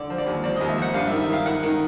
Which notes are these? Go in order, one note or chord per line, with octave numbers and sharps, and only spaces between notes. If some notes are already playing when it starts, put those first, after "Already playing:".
Already playing: D3 D5
F3
D5
D#2
F3 D5
D#2 D#5
E5
F3 F#5
G2 F5
E5
D#3
E5
D#3 F5
D#3 F#5
D#3